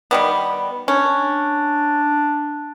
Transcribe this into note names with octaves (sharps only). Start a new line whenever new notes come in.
D#3 G3 B3
C#4 D4